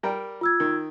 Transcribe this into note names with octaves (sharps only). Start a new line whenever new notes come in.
G3 A#4 G5
F4 E6 G#6
D#3